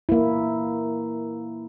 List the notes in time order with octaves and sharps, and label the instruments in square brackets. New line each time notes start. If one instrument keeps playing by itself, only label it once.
[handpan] A#3 E4